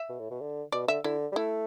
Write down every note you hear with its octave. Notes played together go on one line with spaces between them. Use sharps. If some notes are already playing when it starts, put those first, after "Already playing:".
Already playing: E5
B2
A2
B2
D3
B2 D5
D3 E5
D3 E4
G3
A3 E4